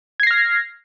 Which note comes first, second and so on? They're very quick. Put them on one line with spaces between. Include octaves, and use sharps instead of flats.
G#6 C7 A#6 F6